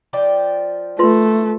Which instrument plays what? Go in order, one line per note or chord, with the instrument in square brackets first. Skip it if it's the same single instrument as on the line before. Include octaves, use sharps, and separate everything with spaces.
[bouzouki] F3 D5 G5
[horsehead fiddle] A3 [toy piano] F4 B4 C6